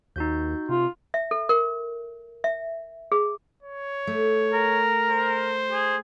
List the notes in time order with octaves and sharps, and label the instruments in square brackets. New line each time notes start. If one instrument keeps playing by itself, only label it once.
[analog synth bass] D#2 [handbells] D#4 F#4 G6
[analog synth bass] C3 [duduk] F4
[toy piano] E5
A4
A#4
E5
G#4
[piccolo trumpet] C#5
[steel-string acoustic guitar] A3
[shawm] A#4
[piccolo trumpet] C5
[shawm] G#4